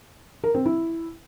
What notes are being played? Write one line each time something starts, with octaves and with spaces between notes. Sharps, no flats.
A#4
C4
E4